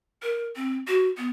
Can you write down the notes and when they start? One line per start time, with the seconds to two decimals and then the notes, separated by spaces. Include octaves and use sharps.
0.23 A#4
0.56 C4
0.87 F#4
1.17 B3